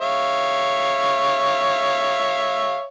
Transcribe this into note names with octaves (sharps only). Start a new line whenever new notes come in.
C#5 E5 F5